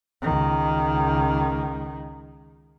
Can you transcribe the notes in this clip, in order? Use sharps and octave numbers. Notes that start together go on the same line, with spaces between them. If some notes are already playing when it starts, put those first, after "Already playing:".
C#2 D#3